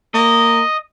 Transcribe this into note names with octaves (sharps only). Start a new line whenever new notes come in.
A#3 D#5